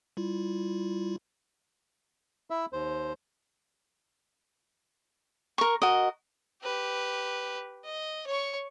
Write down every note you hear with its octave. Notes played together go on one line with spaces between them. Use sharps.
G3 E4 F4
E4 E5
D#2 C5
A#4 C#6
F#4 A#4 D#5
G4 B4
D#5
C#5 C#6